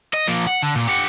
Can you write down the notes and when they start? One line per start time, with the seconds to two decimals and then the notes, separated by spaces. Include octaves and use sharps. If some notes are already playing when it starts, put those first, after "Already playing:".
0.14 D#5
0.28 F3 A#3
0.47 F#5
0.62 D3
0.75 A#2
0.87 G4 F#5